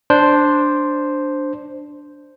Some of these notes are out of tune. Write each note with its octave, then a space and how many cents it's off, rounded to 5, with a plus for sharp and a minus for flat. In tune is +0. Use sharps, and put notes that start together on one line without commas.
D4 +0 C5 +0